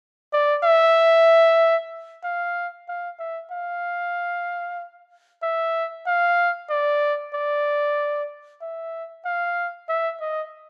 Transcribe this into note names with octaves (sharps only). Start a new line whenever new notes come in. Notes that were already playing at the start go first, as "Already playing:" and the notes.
D5
E5
F5
F5
E5
F5
E5
F5
D5
D5
E5
F5
E5
D#5